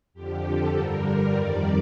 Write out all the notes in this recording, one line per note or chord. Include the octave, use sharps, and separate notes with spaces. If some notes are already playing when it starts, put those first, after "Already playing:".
F2 D3 F3 G4
A4
G2 D3 G3 A#4
F2 D#3 G3 D5